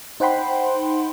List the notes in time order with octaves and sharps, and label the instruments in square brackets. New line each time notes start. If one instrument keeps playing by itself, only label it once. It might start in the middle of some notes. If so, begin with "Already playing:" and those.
[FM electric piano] D#4 C5 F#5 G5 B5 C6